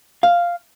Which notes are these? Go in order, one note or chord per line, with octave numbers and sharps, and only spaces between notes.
F5